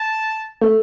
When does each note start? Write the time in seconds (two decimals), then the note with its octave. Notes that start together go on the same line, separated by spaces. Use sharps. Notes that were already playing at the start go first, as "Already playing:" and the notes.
Already playing: A5
0.61 A3